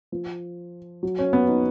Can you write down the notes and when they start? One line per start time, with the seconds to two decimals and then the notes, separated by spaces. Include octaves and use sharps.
0.12 F3
1.03 F#3
1.19 C#4
1.33 B3
1.49 D#4